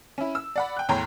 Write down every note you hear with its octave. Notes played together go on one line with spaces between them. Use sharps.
C#4 E4
E6
D5 F#5 B5
G5 F#6
E2 A2 C#5 G5 A#5 C6